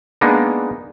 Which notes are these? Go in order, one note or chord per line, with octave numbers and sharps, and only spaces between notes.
G#3 A#3 B3 D4 D#4